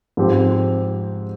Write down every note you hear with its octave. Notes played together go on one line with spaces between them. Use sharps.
G#2 F3 C4 G4